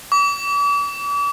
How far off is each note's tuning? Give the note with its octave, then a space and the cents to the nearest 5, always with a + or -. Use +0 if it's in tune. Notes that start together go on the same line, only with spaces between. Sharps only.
D6 -45